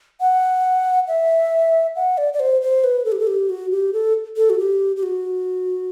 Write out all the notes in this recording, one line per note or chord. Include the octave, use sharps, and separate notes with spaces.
F#5
E5
F#5
D5
D5
C5
C5
B4
A4
G4
A4
G4
F#4
G4
A4
A4
F#4
G4
G4
F#4